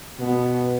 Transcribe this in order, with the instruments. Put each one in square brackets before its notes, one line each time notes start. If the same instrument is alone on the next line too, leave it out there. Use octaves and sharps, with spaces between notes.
[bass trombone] B2 [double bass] B3